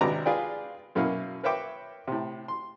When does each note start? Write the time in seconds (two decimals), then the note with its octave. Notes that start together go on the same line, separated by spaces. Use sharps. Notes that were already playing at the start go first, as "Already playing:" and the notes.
0.01 G#1 C3 D4 B4 A#5 D6
0.26 F4 G#4 B4 D5 G5
0.95 F#2 B2 A#3 C#4 E4 F5
1.43 A#4 B4 C#5 E5 G5 D6
2.08 A2 C3
2.48 C6